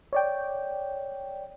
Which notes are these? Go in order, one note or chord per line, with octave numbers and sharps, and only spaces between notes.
C#5 D5 G5